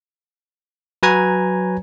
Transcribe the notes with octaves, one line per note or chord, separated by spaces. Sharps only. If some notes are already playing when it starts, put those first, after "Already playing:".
F#3 B4 C#5 G#5 A#5 G#6